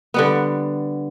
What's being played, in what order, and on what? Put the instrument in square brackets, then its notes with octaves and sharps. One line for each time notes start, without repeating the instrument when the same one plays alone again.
[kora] D3 G3 B3